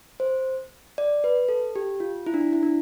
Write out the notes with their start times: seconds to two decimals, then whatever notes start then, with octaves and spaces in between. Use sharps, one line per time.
0.20 C5
0.98 D5
1.24 B4
1.49 A4
1.76 G4
2.00 F4
2.26 E4
2.34 D4
2.41 E4
2.53 E4
2.63 D4